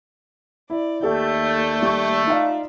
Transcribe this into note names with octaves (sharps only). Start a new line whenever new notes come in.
E4 D5
D#2 A3 G4 A4 D5 G6
G3 C#6
D#4 F4 D5 E5 F5